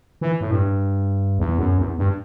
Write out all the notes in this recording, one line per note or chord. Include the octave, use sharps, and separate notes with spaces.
E3
A2
G2
E2
F#2
E2
G2